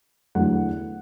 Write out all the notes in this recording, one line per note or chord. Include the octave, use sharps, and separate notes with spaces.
E2 D3 F#3 A3 F#5